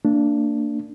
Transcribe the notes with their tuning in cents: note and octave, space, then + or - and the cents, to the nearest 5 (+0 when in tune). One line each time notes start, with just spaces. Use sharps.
A#3 -35 D4 -5